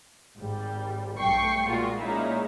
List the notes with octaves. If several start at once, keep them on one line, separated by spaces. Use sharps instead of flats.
G#1 G3
B1 G2 A3 G5 C#6 C7
A#2 G#3 F4 F#4
A#2 G#3 A#3 C#4 D#4 E4